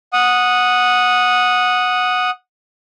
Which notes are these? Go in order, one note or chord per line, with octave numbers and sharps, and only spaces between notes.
F#5 D#6